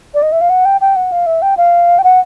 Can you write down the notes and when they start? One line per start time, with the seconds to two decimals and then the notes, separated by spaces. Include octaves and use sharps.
0.14 D5
0.22 D#5
0.32 E5
0.41 F5
0.50 F#5
0.65 G5
0.81 G5
0.96 F#5
1.12 F5
1.26 E5
1.42 G5
1.57 F5
1.99 G5
2.04 F#5